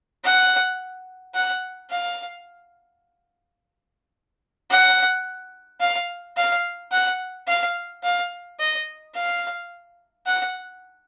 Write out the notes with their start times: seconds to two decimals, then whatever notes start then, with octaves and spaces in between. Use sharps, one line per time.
0.24 F#5
1.34 F#5
1.90 F5
4.70 F#5
5.80 F5
6.37 F5
6.92 F#5
7.47 F5
8.03 F5
8.60 D#5
9.15 F5
10.26 F#5